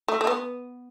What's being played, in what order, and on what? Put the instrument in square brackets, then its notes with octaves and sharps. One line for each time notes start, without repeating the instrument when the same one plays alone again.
[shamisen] A3
A3
B3